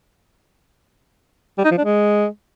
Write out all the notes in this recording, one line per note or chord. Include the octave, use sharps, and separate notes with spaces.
G3
D#4
F3
D4
G#3